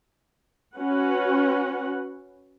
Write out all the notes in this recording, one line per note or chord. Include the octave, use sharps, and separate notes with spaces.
C#4 F#4 B4 F#5